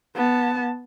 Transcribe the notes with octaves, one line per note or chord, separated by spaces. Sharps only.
B3 A5